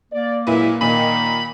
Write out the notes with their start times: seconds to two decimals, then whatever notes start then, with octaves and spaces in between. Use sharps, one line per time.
0.12 A#3 D5
0.47 A#2 F#3 G#3 E4 B4
0.81 A#2 D#3 B5